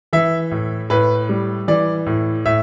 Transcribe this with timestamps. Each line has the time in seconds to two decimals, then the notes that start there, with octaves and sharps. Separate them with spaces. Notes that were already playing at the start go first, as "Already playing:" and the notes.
0.13 E3 E5
0.51 A2
0.90 A2 B4
1.29 G3
1.68 E3 D5
2.06 A2
2.45 A2 E5